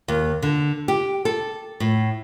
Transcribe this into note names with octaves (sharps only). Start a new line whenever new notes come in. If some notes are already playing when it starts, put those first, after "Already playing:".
D#2
D3
G4
A4
A2